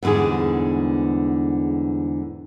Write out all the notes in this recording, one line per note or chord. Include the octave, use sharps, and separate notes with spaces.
E2 G#2 D3 G3 G#4